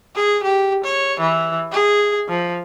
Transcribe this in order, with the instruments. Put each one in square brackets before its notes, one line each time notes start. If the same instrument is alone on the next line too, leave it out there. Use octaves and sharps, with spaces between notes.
[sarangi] G#4
G4
C#5
E3
G#4
F3